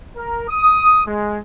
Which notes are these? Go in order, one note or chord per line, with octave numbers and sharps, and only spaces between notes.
A#4
D#6
G#3